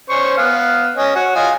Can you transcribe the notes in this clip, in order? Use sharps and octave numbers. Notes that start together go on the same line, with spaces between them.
C#4 C5 C#6
B3 F5
C#4 D#5
F#4 C#5
F4 D#5 G#5